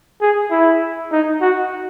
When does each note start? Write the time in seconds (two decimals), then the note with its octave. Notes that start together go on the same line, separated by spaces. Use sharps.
0.22 G#4
0.51 E4
1.12 D#4
1.41 F#4